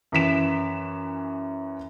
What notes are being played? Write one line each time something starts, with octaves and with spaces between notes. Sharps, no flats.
F#2 E3 B6 E7